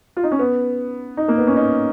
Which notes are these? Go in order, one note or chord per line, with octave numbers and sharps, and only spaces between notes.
F4
D#4
C#4
B3
D#4
A#3
B3
C#4
D#4